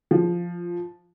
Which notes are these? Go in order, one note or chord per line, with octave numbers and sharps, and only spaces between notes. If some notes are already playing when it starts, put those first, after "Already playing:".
F3